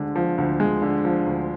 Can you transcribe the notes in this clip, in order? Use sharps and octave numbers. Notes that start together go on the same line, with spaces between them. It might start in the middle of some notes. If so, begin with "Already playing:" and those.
Already playing: D2 D3 G#3
F3
D2
G#3
D3
F3
D2